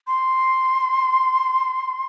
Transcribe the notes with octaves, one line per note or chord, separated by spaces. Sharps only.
C6